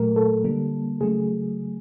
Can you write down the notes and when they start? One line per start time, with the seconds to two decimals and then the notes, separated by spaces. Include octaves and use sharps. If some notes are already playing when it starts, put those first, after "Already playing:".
Already playing: A#2 F#3 A3 A#4
0.16 A4
0.44 D3 G3 A#3
1.01 C#3 F#3 A3 G#4